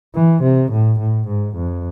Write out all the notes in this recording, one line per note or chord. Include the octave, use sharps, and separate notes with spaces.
E3
C3
A2
A2
G#2
F2